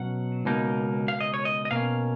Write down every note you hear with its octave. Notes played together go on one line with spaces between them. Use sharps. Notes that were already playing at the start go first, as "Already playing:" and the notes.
Already playing: B2 F#3 C#4 F#5
C#2 B2 A#3 D#4
F5
D#5
C#5
D#5
D#5
B2 A#3 C#4 F5